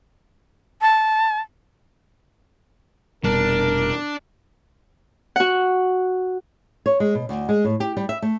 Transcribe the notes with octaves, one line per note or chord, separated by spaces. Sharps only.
A5
F1 B2 G3 D4 A#4
F#4 F#5
C#5
G#3
B2
D2
G#3
A2
G4
G3
E5
A3